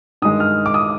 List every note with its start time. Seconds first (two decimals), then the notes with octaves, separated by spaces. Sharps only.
0.22 G2 D#3 G#3 D#6
0.40 F6
0.66 D6
0.74 D#6